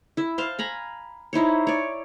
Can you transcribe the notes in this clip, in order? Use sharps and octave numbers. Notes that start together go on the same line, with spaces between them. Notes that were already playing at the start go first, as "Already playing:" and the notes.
E4 E5
C5 F5 A5 C6
G#5 A#5 B5
D#4 E4 C5 C#5
C#5 D5